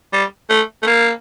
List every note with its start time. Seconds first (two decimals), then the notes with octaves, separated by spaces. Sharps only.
0.13 G3
0.50 A3
0.82 A3
0.87 A#3